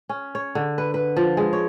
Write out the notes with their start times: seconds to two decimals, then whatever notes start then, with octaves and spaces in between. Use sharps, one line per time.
0.09 C#4
0.35 C#5
0.55 D3
0.78 B4
0.94 B4
1.17 F3
1.37 G#3
1.53 C#5